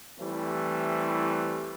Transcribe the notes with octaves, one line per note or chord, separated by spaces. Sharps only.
E3 G3 A3 C4 E4